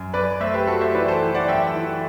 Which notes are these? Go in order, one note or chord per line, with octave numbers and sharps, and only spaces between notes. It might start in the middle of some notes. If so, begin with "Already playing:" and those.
Already playing: F#2
F#2 B4 D5
A3 C5 E5
G4 B4
A3 F#4 A4
C5 E5
E3 B4 D5
A4 C5
E3
D5 F#5
F#2 E5 G5
E3